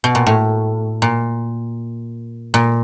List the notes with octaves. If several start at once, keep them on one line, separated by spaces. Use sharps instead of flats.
B2
A#2
A2
A#2
A#2